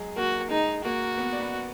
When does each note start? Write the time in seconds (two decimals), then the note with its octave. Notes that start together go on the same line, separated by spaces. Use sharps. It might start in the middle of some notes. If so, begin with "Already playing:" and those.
Already playing: F#3 G#3 G#4
0.16 A#3 F#4 A#4
0.50 G#3 D#4 G#4
0.84 A#3 F#4 A#4
1.18 B3 B4
1.33 D5
1.40 B3 B4